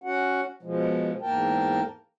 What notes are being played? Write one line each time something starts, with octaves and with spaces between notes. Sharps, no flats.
C#4 F#4 F#5
B2 F3 G#3
E2 G#2 A#3 A#4 G5 A5